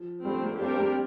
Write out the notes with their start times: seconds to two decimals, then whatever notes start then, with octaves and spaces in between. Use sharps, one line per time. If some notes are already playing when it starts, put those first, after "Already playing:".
Already playing: F3
0.25 D3 G3 A3 C4
0.43 A#3
0.61 G3 C4 D4 G4 A#4 D5
0.74 C4
0.80 A#3